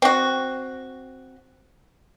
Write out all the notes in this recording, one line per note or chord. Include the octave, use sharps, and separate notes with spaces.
C4 F#4